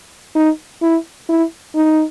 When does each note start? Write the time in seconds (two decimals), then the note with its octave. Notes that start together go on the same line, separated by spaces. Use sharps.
0.35 D#4
0.82 E4
1.29 E4
1.75 D#4